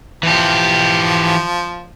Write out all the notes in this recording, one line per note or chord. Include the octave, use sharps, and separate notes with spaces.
E3 F3 G4